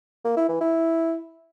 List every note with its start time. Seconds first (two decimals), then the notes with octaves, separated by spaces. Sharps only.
0.25 A#3
0.37 E4
0.49 E3
0.61 E4